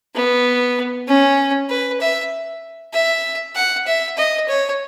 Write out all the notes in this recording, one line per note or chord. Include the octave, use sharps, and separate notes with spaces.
B3
C#4
B4
E5
E5
F#5
E5
D#5
C#5